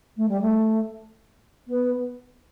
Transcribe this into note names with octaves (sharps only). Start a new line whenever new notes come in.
A3
G3
A3
B3